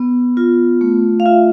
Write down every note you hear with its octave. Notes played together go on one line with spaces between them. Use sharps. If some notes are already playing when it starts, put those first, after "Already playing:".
Already playing: B3
F4
A3
F5
F4 E5